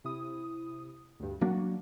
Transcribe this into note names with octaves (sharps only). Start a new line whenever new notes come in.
C3 E4 D#6
D2 G2
F#3 A#3 D4 F#4